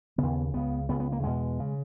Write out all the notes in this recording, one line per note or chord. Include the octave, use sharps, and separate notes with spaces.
D#2 C#3 B3
C#2 C#3 B3
C#2 C#3 B3
B3
A#3
E2 B2 G#3
C#3